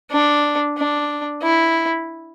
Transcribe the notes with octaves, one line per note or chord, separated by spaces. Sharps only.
D4
D4
E4